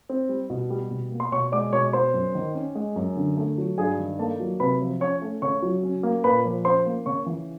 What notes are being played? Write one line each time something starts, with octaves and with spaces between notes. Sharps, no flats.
C4
G3
B2
G3
B2
A#3
C6
B2 C#5 C#6
G#3 D5 D6
B2 C#5 C#6
B3 C5 C6
F#2
D#3
C#4
G#3
F#2
D3
A3
F#3
G2 G#4 G#5
D#3
A#3 A4 A5
F#3
C3 B4 B5
F3
C#4 C#5 C#6
A3
C#3 C#5 C#6
F#3
C#4
A#3
A#2 B4 B5
F3
C#4 C5 C6
A#3
C#3 C#5 C#6
E3